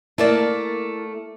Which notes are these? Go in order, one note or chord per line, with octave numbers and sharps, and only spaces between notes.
A3 A#3 E4 A#4 D5 A5